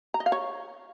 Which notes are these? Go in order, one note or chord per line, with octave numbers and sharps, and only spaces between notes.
A#5
D#5
F5
C#5